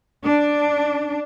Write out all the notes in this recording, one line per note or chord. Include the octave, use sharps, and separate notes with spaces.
D4